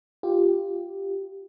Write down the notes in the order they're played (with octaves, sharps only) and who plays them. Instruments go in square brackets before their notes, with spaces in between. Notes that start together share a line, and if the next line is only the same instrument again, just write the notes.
[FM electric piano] F4 G4